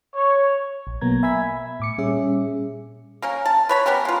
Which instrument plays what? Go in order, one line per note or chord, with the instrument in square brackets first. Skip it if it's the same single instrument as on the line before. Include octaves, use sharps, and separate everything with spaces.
[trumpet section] C#5
[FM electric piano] A#1
B2 F#3 A#3 B3 A#5 G#6
E5 G#5 B5 E6 G#6 B6
E5
A2 D6 C#7
A#2 G3 C#4 G#4 E5
[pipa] A#3 C#4 A#4
A5
B4 C#5 B5
B3 C#4 G4 A#4
G#3 F4